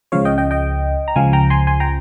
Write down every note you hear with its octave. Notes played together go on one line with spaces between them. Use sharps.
C#2 C#3 F3 C#5 F5
D#5 G5
D#5 G5
D#5 G5
A#5
C#2 C#3 F3 F5 G#5
G5 A#5
G#5 C6
G#5 C6
G5 A#5